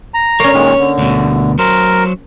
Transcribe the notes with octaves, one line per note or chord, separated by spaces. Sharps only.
A#5
A#3 C#4 C#5
A#2 D#3 G#3
D3
D2 B2
F#3 A#4 C5